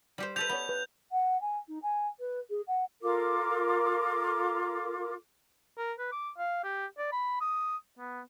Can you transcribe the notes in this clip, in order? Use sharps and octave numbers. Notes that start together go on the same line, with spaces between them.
G3 G4 C5
G4 A4 B4 G6 F7
B3 C#5 B5
B4
F#5
G#5
D#4
G#5
B4
G#4
F#5
F4 A4 A#4 D6
A#4
B4
D6
F5
G4
D5
B5
D#6
B3